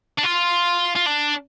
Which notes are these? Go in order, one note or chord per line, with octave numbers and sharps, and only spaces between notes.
D4
F4
F4
D4